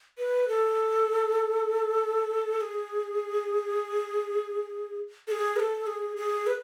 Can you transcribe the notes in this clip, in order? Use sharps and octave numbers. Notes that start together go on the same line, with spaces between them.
B4
A4
A4
G#4
A4
G#4
B4
A4
G#4
G#4
B4